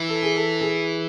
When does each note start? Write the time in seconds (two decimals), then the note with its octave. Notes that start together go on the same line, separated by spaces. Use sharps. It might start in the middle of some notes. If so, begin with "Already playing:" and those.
Already playing: E3
0.09 A4
0.22 G#4
0.36 A4
0.61 G#4